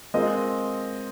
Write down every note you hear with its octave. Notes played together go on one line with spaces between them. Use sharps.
G#3 C4 F4 A#4 D#5